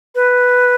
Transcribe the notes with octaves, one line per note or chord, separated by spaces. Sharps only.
B4